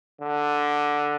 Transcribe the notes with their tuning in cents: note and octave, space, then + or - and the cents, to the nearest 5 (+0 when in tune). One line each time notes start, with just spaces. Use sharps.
D3 +0